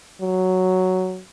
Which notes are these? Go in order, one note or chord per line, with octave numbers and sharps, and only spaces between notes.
F#3